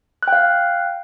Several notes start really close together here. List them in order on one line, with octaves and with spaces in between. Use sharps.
F#6 G5 F5